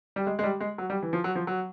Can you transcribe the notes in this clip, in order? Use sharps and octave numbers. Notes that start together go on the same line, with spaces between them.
G3
G#3
G#3
G3
G#3
F#3
G3
E3
F3
F#3
F3
F#3